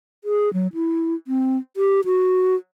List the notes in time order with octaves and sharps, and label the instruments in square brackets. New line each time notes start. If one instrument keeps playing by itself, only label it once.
[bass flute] G#4
F#3
E4
C4
G4
F#4